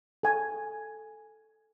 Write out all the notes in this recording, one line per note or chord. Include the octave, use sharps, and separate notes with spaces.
A4 G#5